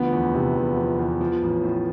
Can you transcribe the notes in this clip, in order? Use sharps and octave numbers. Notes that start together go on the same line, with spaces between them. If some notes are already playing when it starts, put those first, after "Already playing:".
Already playing: D2 F3 B3
E2
C3
E2
F3
E2
F3
A1
A2